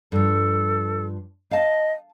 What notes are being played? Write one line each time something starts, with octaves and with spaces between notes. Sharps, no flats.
G2 F3 A4
D#5 F5 A5